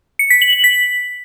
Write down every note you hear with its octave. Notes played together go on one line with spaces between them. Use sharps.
C#7
B6
F#7
F#7
B6